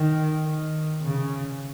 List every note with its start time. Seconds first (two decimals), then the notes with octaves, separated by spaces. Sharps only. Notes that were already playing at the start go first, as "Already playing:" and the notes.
Already playing: D#3
0.46 D#3
1.02 C#3